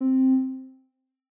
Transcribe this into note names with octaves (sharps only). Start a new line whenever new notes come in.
C4